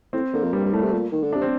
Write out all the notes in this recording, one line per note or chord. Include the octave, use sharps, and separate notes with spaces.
A2 C4
D3 A#3
F2
G2 G3
G2
A2 A3
C3
A#2
D#3
D3
C3 D4
C4